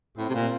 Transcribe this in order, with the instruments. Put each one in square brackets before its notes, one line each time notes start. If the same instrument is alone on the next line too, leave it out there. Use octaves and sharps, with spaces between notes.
[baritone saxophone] A2 [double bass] C4
[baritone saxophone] C3
A#2